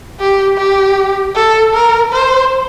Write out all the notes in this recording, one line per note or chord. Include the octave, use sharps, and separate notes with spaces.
G4
G4
A4
A#4
C5